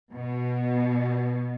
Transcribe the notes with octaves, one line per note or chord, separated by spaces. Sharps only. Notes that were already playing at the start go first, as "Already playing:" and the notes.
B2